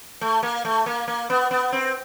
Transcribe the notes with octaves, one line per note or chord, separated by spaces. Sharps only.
A3
A#3
A3
A#3
A#3
B3
B3
C4